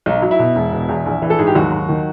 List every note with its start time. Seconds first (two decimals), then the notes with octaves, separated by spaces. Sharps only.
0.06 B1 D#4
0.22 F#3
0.31 E4
0.39 B2
0.55 E1
0.72 B2
0.89 E2
1.06 A#1
1.22 E3
1.30 A4
1.39 G#2 G#4
1.47 G4
1.55 D#2 F#3 F#4
1.72 F#3
1.89 D#3